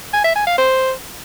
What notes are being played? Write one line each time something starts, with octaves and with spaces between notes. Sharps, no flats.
G#5
E5
G#5
F5
C5